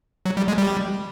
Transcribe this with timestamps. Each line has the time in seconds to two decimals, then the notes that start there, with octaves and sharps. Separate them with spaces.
0.26 F#3
0.37 G3
0.48 G#3
0.58 G3